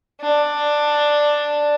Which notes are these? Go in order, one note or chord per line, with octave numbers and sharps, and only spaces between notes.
D4